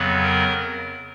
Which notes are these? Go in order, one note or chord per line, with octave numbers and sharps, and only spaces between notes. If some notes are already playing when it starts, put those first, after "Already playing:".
Already playing: F2 C#3 F#3 B3
A#4